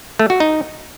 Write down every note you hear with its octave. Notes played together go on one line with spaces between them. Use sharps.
A3
F#4
D#4